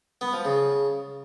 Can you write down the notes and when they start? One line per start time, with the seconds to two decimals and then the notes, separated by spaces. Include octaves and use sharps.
0.21 B3
0.33 F3
0.45 C#3